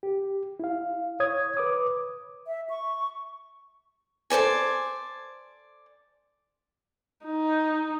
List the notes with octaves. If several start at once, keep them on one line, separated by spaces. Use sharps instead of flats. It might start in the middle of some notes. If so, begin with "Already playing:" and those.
G4
E4 F5
C#5 D#6 G#6
B4 D6 D#6
E5
C#6
A4 C5 D5 G#5
D#4